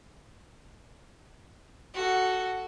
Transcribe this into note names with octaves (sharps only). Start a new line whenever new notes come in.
F#4 A4